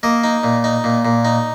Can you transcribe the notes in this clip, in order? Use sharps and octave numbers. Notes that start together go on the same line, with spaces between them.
A#3 D#5
D#4
A#2
D#4
A#2
A#2
D#4